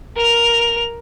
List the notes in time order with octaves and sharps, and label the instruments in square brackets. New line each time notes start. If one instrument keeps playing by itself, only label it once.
[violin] A#4 F7